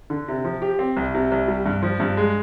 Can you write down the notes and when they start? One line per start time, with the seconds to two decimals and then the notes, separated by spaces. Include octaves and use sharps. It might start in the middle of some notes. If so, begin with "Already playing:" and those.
0.10 D3
0.28 C3
0.44 F3
0.62 G4
0.79 C4
0.97 C2
1.15 C3
1.32 C2
1.48 G3
1.66 G2
1.82 F3
2.00 G2
2.17 G#3